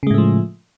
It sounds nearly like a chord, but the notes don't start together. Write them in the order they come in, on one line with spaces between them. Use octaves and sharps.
C#3 G#3 A2 A3 F3